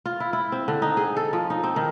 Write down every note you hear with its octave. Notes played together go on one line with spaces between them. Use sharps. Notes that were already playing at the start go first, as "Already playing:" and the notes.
F4
E4
E4
C4
D3
D#4
G#4
A4
F3
D#4
C4
D#3